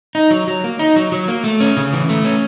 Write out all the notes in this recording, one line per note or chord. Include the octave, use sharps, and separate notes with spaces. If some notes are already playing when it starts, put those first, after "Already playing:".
D#4
F#3
F#3
A#3
D#4
F#3
F#3
A#3
A3
C#4
C#3
E3
A3
C#4